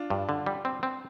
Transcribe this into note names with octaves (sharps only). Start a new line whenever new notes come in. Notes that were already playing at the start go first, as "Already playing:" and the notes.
Already playing: D4 F4
G2
D3
G3
C4
C4